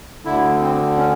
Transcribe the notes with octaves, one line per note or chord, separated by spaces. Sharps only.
D2 D3 E4
C4
C#4